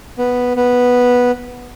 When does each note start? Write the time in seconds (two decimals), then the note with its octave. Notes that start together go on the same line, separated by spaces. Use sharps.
0.18 B3
0.56 B3